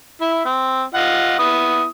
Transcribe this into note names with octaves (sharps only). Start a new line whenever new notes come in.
E4 E5
C4
F4 D#5 F#5
B3 E4 D#6